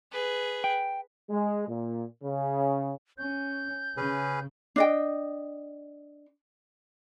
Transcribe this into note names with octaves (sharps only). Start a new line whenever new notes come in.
G#4 B4
G5
G#3
A#2
C#3
C#4 G6
C#3 C#4 G#4 B4
D4 D#5 G5